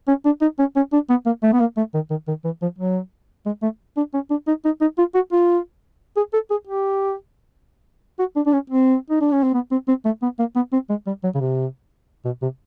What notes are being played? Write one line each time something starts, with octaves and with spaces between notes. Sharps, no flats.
C#4
D4
D#4
C#4
C#4
D4
B3
A#3
A3
B3
A#3
A3
D#3
D#3
D#3
E3
F3
F#3
G#3
A3
D4
C#4
D4
D#4
D#4
D#4
F4
F#4
F4
G#4
A4
G#4
G4
F#4
D4
D4
C#4
C4
D#4
D4
C#4
C4
B3
C4
C4
A3
B3
A#3
B3
C4
G#3
G3
F#3
C#3
C3
B2
C3